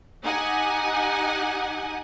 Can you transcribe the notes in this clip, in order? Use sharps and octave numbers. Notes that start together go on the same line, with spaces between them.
D#4 G4 F#5 G#5